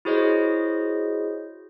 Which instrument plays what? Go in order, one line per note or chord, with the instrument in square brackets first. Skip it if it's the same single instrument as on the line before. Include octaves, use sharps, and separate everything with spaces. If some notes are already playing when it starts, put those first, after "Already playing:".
[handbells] E4 F#4 G#4 C5 C#5 D#5